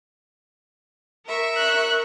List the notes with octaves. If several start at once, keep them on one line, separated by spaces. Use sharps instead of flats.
A#4 E5 C#6
F#6